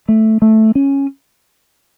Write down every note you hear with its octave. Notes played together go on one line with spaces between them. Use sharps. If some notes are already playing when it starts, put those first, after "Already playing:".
A3
A3
C#4